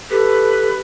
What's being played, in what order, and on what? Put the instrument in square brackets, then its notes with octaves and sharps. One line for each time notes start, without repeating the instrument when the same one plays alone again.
[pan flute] G4 [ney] A4 [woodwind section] B4